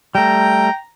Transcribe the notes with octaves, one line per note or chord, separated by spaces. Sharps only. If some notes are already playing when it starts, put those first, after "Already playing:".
G3 A3 G5 A#5